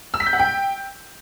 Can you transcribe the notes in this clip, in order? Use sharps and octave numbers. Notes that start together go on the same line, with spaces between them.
E6
B6
G6
F#5
G5